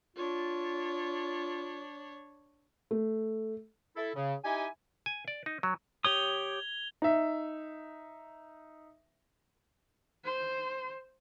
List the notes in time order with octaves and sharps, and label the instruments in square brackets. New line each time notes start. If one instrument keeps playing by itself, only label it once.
[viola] D4 C#5 [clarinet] F4
[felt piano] A3
[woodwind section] E4 A4
C#3
D#4 E4 G4 G#5
[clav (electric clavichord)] G#5
D5
D#4
F#3
[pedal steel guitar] G4 C#5 D#6 [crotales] G#6 F7 G7
[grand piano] D#4 E5
[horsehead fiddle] C5